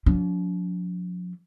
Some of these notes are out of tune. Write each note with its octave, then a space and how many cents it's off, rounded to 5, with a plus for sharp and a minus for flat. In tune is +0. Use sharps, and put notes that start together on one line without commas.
F3 +45 D4 -40